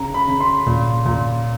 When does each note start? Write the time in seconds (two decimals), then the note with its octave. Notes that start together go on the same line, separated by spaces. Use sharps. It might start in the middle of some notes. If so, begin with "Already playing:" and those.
Already playing: C#3 A#5
0.14 B5
0.27 C#3
0.40 C6
0.66 A#2
1.06 A#2